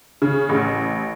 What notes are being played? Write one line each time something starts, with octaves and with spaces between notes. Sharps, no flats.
C#3
A1